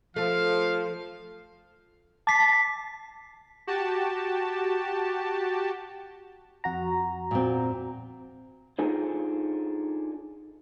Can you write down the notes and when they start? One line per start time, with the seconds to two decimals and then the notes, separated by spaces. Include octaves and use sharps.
0.16 F3 A3 F5
2.27 A5 D6 B6 C7
3.67 F#4 G4 A5
6.64 F2 F#4 A#5
7.31 A#2 C4
8.79 D4 D#4 F4 G#4 A4 C5